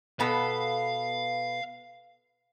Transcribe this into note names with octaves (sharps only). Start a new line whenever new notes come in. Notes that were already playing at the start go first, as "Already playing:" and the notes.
B2 B3 A4 F5